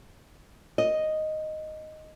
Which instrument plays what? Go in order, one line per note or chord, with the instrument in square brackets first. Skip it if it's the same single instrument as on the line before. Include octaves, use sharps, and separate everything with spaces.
[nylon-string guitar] D#5